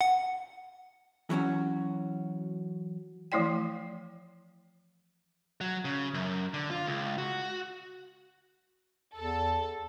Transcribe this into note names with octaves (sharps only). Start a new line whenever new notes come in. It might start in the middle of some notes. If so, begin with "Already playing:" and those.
F#5
E3 F#3 C#4 F#4
E3 F3 A3 E4 D5 G5
F#3
C#3
F#2
D3
F4
C#2
F#4
E2 A4